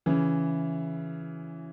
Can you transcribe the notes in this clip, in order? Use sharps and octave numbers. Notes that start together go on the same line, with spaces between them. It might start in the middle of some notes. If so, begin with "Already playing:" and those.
C#3 E3